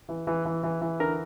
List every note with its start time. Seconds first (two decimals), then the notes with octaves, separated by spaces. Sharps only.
0.09 E3
0.27 E3
0.45 E3
0.63 E3
0.81 E3
1.00 D3 A#4